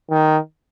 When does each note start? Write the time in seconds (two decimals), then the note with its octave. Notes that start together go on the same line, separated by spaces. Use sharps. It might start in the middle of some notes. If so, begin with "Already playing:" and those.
0.11 D#3